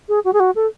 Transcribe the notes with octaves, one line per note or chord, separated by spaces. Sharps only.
G#4
F#4
G#4
F#4
A4